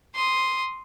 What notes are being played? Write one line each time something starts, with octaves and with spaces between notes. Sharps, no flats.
C6 D#6